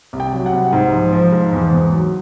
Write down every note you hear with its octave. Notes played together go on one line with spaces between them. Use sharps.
C2
G5
F#3
F#5
C2
G#2
F3
F3
G#2
E2
E2
F#3